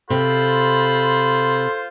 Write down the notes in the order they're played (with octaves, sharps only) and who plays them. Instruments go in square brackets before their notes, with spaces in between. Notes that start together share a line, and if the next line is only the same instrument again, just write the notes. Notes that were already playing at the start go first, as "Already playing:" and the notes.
[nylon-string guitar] C3 [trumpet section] F4 C5 [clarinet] A4 [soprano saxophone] B5